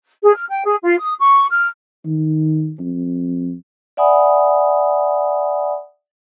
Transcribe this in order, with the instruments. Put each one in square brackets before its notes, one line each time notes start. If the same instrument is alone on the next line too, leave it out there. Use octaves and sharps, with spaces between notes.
[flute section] G#4
F6
G5
G#4
F4
D#6
C#6
F6
[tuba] D#3
F2
[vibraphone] D5 E5 F#5 G#5 B5 D#6